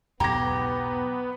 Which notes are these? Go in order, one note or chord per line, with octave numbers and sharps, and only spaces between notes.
B1 E2 G#2 B3 G4 A#5 A#6